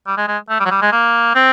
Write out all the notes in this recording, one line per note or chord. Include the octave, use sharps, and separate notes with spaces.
G3
G#3
G#3
A3
G3
F#3
G3
G#3
A#3
C4